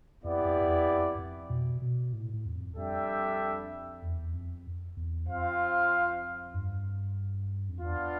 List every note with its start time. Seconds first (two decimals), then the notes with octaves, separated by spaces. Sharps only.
0.24 F2 B3 E4 G4 D5
0.45 F2
0.61 F2
0.66 E2
0.86 F2
1.18 F2
1.50 B2
1.82 B2
2.13 A2
2.33 A2
2.46 E2
2.55 F2
2.76 F2 G3 D4 A4 E5 G5
4.02 E2
4.34 F2
4.97 E2
5.28 F2 C4 F4 C5 F5
6.54 G2
7.69 F2
7.80 E2 B3 D4 F4